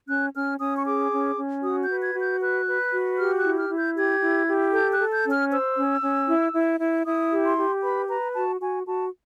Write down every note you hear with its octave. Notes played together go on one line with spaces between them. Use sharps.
C#4 F#6
C#4 F6
C#4 D#6
C#6
G#4 D6
C#4
C#4
F#4 D#6
G6
B4
G#6
F#4
G6
B4 F#6
B4
F#4
G4 F6
F#6
E4
F6
E4
G6
G4 G#6
E4
G4
A4 G6
F#6
A4
G6
C#4
F6
C5 E6
C#4
C#4
E4
E4
E4
E4 D#6
G4
C6
G4
B4 B5
B4 A#5
F#4 A5
F#4 G#5
F#4 A5